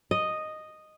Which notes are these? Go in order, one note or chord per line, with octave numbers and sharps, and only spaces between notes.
D#5